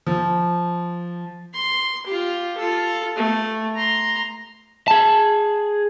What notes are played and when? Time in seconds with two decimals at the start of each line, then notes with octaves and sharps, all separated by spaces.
0.07 F3
1.54 C6
2.07 F4 G4
2.58 F4 A4
3.16 A3
3.75 A#5 C6
4.88 G#4 A5